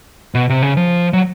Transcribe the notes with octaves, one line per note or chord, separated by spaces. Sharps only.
B2
C3
C#3
F3
F#3